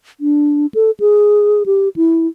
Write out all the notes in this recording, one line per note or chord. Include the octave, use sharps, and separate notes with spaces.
D4
A4
G#4
G4
E4